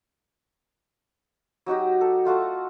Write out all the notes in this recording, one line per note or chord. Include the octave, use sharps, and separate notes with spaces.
F#3 D#4 F#4 G4
A4
A3 F4 F#4 A4